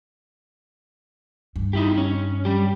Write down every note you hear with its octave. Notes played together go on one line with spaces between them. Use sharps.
G2
D#4 E4 G4
C#4
G3 G4